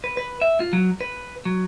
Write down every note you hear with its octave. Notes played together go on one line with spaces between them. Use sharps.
B4
B4
E5
F4
F#3
B4
F#3